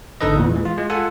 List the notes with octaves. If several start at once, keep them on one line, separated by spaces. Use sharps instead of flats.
G#1 D3 D#4 A4 B4 D#5
E2 A#2 E3
E3 G#3
F4
G#3
F4 A4 F#5 G#5